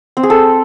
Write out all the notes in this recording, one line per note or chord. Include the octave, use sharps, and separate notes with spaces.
C4
G#4
A4